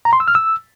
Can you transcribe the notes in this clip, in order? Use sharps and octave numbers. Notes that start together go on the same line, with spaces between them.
A#5
C6
E6
F6
E6